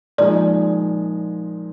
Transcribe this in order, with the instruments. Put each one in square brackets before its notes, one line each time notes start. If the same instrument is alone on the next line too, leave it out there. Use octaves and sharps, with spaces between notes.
[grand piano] A#2 F3 G#3 D#4 G#4 [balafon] D5